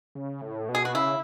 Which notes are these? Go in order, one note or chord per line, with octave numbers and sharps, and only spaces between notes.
C#3
A2
B2
G#4
F#4
C#3 E4